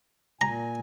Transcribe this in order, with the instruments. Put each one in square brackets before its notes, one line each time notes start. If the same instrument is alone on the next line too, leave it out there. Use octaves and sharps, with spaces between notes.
[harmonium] A#2 G#5 [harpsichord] A#5